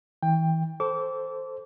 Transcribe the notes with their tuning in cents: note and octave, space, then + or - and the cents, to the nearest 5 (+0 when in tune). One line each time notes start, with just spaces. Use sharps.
E3 -30 G5 +15
A4 +0 C5 +0 D6 -30